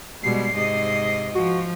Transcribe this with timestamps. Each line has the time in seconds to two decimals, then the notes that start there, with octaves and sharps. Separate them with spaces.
0.23 B2 G3 G#3 C7
0.54 G#2 C3 D#5
1.35 F3 F#4